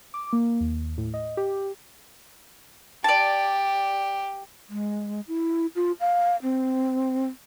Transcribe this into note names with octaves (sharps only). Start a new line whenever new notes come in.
D6
A#3
D#2
A2
D#5
G4
G4 D5 A5
G#3
E4
F4
F5
C4